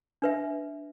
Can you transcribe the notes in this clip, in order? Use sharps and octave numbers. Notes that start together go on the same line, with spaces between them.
D4 B4 E5